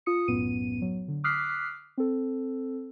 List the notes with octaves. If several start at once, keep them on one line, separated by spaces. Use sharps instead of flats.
F4 D#6 C#7
B1 F#2 A2 B3 D#7
F#3
D3
D6 D#6 F6 F#6 B6 C7
C4 A4